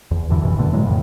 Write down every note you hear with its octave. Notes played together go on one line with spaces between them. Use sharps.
E2
D2 G2 D3 E3
F#1 F#2 B2 E3
G2 B2 D3 A3
A2 E3 F#3 G#3
F2 A2 C#3